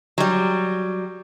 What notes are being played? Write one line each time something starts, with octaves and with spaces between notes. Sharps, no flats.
F#3 G3